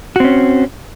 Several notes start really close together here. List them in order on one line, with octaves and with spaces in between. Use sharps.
F#4 C4 C#4